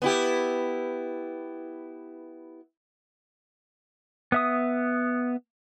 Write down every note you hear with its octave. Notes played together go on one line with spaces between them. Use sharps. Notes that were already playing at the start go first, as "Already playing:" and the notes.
B3 E4 G4
B3 E5 D#6